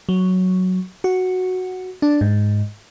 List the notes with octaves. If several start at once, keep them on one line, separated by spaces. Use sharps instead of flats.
F#3
F#4
D4
G#2